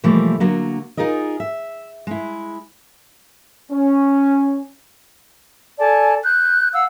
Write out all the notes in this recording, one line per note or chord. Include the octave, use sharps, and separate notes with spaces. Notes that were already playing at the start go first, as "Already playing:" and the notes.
B2 E3 F3 G3 A3 A#3
D3 F#3 A#3
D#4 F4 G#4 A#4 D#5
E5
G#3 E4
C#4
A4 D5 G#5 A5
F#6 G6
F5 F#5 E6